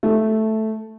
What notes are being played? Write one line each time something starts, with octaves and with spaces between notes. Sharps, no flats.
A3